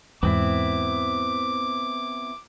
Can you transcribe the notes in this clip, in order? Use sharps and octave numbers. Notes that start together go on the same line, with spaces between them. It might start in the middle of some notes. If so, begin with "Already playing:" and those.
E2 G#2 B3 C4 E4 D6